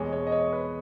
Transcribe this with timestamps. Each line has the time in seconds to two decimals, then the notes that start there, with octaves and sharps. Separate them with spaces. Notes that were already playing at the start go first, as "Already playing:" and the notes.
Already playing: E2 B2 G#3 C#5
0.13 C#5
0.27 D#5
0.32 C#5
0.53 B4